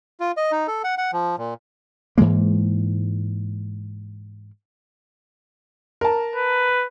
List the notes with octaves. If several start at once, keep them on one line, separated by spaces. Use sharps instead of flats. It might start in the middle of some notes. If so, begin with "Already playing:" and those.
F4
D#5
D#4
A4
F#5
F#5
F3
A#2
G#2 E3 G#3 A#3
A#4 A5
B4